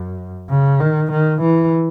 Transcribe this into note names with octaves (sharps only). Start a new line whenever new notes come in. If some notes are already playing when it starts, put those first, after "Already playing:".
Already playing: F#2
C#3
D#3
D#3
E3